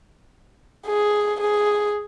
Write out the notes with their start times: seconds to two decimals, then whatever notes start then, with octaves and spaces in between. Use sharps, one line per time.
0.87 G#4
1.41 G#4